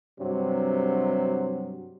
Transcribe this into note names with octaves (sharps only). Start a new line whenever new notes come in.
G2 C3 F#3